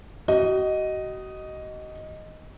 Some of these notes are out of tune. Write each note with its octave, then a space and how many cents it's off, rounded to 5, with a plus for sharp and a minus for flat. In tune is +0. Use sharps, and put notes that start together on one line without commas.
F#4 +40 D#5 +0